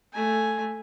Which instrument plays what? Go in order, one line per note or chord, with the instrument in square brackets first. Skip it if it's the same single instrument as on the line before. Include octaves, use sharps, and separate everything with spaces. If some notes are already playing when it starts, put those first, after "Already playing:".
[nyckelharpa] A3 G#5